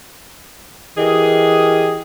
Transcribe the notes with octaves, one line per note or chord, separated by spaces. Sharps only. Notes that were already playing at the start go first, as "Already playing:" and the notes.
E3 G4 G#4 A#4 D#5